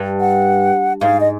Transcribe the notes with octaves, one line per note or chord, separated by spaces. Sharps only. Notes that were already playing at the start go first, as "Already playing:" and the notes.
Already playing: G2
F#5
G#2 F5
D#5